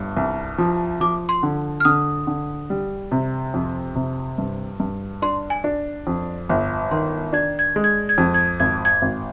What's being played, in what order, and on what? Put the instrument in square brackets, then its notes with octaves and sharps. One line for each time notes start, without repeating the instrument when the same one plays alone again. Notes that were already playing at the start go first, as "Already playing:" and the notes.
Already playing: [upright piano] G1 G2
C2
F3
[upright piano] F3 [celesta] D6
[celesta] C6
[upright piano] D3
[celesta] F6
[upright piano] D3 [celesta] D#6
[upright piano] D3
G3
C3
F2
C3
G2
G2
[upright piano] D4 [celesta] C6
[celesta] G#5
[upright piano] D4
F2
G1
[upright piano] D#3 [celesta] C6
[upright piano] D4 [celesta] G#6
[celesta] G#6
[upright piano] G#3
[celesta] G#6
G#6
[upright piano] F2
[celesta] G#6
[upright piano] G#1 [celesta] G#6
[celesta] G#6
[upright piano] G#1